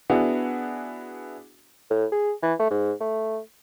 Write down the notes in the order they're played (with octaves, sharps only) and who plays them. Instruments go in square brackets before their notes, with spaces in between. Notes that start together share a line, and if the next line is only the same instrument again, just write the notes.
[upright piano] B3 D4 E4 F#4 G#4
[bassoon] A2
G#4
E3
A3
G#2
A3